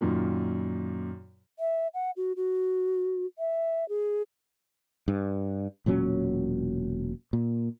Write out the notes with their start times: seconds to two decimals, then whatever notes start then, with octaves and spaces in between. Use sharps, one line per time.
0.01 F#2 A#2 D#3
1.59 E5
1.94 F#5
2.17 F#4
2.36 F#4
3.39 E5
3.89 G#4
5.08 G2
5.86 E1 A#2 F#3 C#4
7.33 A#2